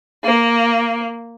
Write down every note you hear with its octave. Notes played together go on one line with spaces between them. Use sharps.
A#3